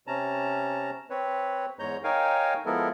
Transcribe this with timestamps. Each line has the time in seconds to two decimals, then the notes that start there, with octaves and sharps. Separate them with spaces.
0.07 C3 C#4 A5 A#5
1.10 C4 B4 C#5
1.79 E2 G#2 G#3 C#5 A#5 G6
2.04 D#4 A#4 C#5 F5 G5 G#5
2.66 F3 G#3 B3 E4 A4 A#4